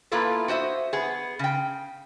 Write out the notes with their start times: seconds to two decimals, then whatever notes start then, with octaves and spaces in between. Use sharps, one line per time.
0.12 A#3 B3 E4 F4 A4 B4
0.48 F#4 C5 D#5 E5
0.93 B3 G#4
1.39 C#3 G5